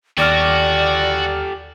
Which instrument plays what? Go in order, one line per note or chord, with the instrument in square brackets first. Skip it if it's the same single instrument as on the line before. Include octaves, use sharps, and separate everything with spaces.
[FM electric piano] D#2 D6 F6 [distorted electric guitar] F#4 [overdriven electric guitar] G4 A4 [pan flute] D5